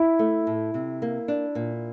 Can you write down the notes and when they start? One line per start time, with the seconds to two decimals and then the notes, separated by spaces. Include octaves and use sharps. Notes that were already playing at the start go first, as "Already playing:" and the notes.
Already playing: E4
0.19 A3
0.47 A2
0.74 C3
1.02 A#3
1.28 D4
1.55 A#2